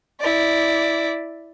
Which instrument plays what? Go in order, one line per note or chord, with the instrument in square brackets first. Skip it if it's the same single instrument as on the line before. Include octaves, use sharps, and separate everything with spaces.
[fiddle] E4 D5